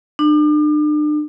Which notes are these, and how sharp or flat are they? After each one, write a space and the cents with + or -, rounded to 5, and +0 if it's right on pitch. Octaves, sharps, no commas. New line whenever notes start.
D4 +40